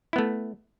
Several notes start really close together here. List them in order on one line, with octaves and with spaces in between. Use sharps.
E4 B3 A3